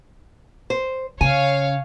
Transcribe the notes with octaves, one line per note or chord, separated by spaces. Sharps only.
C5
C#3 C#5 F5 G#5